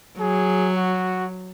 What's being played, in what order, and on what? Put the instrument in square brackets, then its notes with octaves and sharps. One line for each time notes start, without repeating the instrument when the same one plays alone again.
[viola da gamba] F#3 [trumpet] G#4
[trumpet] F#4